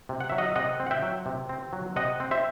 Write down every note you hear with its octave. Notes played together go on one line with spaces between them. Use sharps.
C3
F#5
F#3 E5
D#5 F#5
C3 D#5 F#5
C4
F#5
E5 G5
F#3
C3
C4
F#3
C3 D#5 F#5
C4
C5 E5